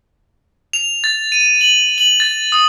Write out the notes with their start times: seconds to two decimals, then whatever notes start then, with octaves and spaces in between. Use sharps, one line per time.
0.73 F7
1.04 A6
1.32 D#7
1.61 F#7
1.98 F#7
2.20 A6
2.52 D#6